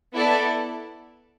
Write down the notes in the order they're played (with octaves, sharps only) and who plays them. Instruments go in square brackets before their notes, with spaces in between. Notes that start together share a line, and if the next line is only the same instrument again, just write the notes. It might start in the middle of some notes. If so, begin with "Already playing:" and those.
[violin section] B3 E4 A4 D5